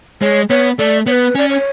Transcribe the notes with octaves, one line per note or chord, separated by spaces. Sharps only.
G#3 C#5
B3 C#5
A3 D5
B3 C#5
B4
C#4 D5
C#5